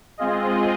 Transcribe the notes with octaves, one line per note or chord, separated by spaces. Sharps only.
G#3 C4 F4 G#4 D#5